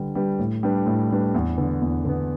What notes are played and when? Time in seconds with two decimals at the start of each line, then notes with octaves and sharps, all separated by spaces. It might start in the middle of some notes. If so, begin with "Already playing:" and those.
Already playing: D3 G3 D4 G4 B4
0.15 G3 D4 G4 B4
0.39 A2
0.63 G3 D4 B4
0.87 A2
1.11 G3 D4 B4
1.34 E2
1.57 D3 B3
1.82 E2
2.05 D3 B3